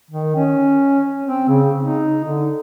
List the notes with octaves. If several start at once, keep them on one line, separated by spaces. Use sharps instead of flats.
D#3
C#4
C4
C#3
D#4
D3